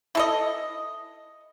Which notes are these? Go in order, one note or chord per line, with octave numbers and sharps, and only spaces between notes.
E4 A4 D#5